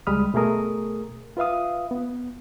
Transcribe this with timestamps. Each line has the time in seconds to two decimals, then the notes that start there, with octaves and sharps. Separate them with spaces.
0.07 C#2 G3 G#3 B5 D#6 F6
0.34 B2 A3 G#4 A#4 D#6
1.37 F4 B4 E5 F5 D#6
1.91 B3